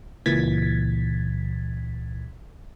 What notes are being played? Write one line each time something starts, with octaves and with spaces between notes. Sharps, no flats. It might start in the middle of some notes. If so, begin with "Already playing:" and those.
C#2 A#2 E3 G#6 A6 B6